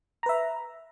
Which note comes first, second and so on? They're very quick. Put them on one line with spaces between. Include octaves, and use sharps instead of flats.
A#5 B4 E5